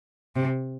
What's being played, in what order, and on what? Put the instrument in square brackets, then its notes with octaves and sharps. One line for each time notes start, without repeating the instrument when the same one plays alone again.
[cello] C3